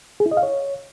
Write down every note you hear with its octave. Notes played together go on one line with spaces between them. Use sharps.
G#4
E4
D#5
F5
C#5